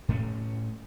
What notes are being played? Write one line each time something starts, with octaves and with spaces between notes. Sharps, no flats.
A2 A3 B3 C#4